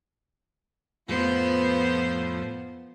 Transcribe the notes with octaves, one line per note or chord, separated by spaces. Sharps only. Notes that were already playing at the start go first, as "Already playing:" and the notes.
F2 A2 F3 B3 C5